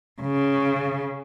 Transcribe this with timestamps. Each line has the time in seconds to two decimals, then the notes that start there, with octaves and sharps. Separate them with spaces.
0.22 C#3